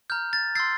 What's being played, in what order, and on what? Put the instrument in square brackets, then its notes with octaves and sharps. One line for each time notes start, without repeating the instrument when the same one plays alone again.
[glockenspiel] A#5 F6 G6
A6
C6 E6 G6 A6 C7